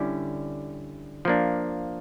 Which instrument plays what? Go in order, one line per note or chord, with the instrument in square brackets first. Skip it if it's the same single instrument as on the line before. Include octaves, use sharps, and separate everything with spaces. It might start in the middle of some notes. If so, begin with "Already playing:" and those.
Already playing: [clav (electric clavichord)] D3 G3 C#4 E4
F3 A#3 D4